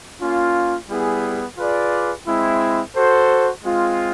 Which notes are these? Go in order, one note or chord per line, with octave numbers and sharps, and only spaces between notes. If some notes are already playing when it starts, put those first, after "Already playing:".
A#3 C#4 F4
G3 B3 E4 G#4
F4 G#4 B4 D5
G#3 C4 E4
F#4 A4 C5
G#3 C4 F4